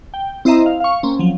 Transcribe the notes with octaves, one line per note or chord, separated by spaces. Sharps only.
G5
C4 E4 C5 D#5 E5 A#5
F5
F5 C#6
A#3 C4 C#4
F3 F#3